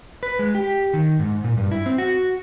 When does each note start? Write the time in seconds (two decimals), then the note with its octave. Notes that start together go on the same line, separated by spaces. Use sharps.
0.23 B4
0.39 G#3
0.55 G4
0.94 D#3
1.19 G#2
1.44 A#2
1.57 G2
1.71 E4
1.86 C4
1.98 F#4